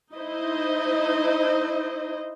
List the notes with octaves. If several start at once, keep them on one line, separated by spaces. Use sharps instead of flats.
D#4 E4 C5 D#5